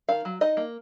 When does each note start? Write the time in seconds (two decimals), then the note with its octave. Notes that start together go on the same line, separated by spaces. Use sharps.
0.09 D#3 F5
0.25 F#3
0.41 D#4 D#5
0.57 A#3